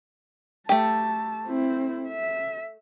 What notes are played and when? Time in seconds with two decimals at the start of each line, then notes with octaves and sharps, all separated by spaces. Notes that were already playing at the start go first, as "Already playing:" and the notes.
0.69 A3 G4 A5
1.46 C4 E4
2.08 E5